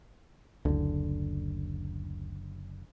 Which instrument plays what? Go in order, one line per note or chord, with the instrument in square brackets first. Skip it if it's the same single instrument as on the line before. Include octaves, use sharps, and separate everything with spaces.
[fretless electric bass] F#1 D3 [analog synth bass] D2